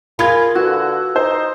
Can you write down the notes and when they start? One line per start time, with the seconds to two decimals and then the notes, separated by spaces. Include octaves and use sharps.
0.19 F4 G#4 A#4 B5 G#6
0.55 D3 F#4 B4 E6
1.16 D#4 C5